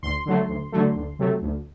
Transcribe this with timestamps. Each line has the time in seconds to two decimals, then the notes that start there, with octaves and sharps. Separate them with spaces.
0.03 D2 C6
0.26 D3 F#3 A3
0.49 D2
0.72 D3 F#3 A3
0.96 D2
1.19 C3 F#3 A3
1.42 D2